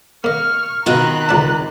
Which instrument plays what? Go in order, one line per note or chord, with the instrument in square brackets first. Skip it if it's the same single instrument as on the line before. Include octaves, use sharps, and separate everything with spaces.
[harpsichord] A#3 D#5 [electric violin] C#6 F6
[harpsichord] B2 F4 [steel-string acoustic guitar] D#3 C4 [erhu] A#5 [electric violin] B5 F#6
[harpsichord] C#2 D5 E5